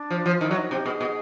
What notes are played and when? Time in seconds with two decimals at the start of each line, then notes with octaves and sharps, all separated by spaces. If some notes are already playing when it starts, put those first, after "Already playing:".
Already playing: D4
0.11 F3
0.26 F3
0.41 D#3 E4
0.51 F#3
0.56 F#4
0.71 C3 G4
0.85 B2 G#4
1.01 B2